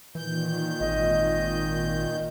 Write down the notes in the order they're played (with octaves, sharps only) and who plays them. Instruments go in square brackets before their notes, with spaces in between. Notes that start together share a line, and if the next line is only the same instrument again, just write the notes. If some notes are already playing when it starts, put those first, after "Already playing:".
[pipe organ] A#2 D#3 G6 [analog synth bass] E3
[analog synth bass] G#1 [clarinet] D#5